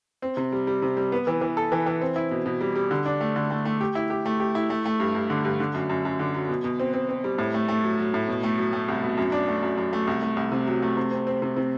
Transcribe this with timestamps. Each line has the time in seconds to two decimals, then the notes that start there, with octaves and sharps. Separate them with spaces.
0.22 C4
0.37 C3
0.52 G3
0.67 G3
0.82 C3
0.97 G3
1.12 B3
1.27 E3
1.41 E3
1.57 A4
1.72 E3
1.86 E3
2.01 C4
2.16 E4
2.31 B2
2.46 B2
2.61 G3
2.76 G3
2.91 D3
3.06 D4
3.21 A3
3.36 D3
3.50 A3
3.65 A3
3.81 G4
3.95 E4
4.10 G4
4.26 A3
4.40 G4
4.55 E4
4.70 A3
4.86 A3
5.00 G2
5.15 G2
5.30 D3
5.45 G2
5.60 D3
5.74 F#2
5.89 F#2
6.05 F#2
6.19 D3
6.34 F#3
6.49 B2
6.64 B2
6.80 C4
6.94 C4
7.09 C4
7.24 G3
7.38 A2
7.54 A3
7.68 A3
7.84 F#3
7.99 F#3
8.14 A2
8.28 B2
8.43 A3
8.58 F#3
8.73 A3
8.88 C2
9.03 B2
9.17 F#2
9.32 D4
9.48 A3
9.63 F#2
9.77 F#2
9.93 A3
10.07 C2
10.22 A3
10.37 C2
10.52 C3
10.67 F#3
10.83 A3
10.97 C3
11.11 C4
11.27 C4
11.42 C3
11.57 C3